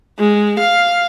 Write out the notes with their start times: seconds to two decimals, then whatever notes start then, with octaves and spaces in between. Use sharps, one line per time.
0.18 G#3
0.60 F5